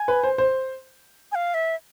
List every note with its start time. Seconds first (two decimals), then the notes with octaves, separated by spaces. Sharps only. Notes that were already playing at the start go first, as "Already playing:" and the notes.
Already playing: G#5
0.08 B4
0.23 C5
0.38 C5
1.32 G#5
1.35 F5
1.54 E5